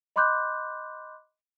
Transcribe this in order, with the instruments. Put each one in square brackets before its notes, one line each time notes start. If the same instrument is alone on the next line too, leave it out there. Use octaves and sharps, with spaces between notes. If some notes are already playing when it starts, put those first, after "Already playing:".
[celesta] D#5 B5 C6 D6 F#6 G6